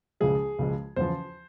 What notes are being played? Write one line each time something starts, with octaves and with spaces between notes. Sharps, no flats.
C#2 C#3 F3 G#3 G#4
C#2 C#3 F3 G#3
E2 C#3 F3 C5